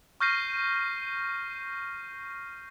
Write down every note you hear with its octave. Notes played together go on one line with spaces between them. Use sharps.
C#6 F6 G6 A#6 C7 D#7